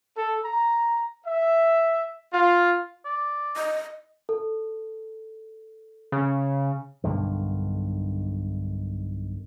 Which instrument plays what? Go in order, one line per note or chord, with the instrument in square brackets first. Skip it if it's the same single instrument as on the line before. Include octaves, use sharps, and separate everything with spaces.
[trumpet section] A4
A#5
E5
F4
[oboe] D5
[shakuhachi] D#5
[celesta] A4
[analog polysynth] C#3
[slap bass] B1 G2 D3 D#3